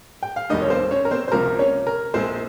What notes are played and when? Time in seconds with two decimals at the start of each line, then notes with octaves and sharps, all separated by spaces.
0.23 G5
0.36 F5
0.50 F1 D#2 D#3 G3 A#3 D#4 D#5
0.62 C#5
0.70 C4 C5
0.91 C#4 C#5
1.05 A#4
1.11 C4 C5
1.28 C5
1.32 C#2 C3 F3 A#3 A#4
1.59 C#4 C#5
1.87 A#4
2.14 A#1 A#2 G#3 C4 C5